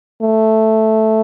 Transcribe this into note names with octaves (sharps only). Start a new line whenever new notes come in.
A3